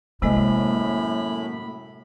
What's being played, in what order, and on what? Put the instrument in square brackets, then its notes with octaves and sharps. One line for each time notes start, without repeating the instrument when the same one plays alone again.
[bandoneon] F#2 A2 B5 [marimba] C3 G#3 D#5 [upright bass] A#3